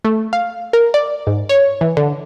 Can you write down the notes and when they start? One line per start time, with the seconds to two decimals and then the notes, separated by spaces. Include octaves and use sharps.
0.05 A3
0.33 F5
0.73 A#4
0.94 D5
1.27 G#2
1.49 C#5
1.81 E3
1.97 D3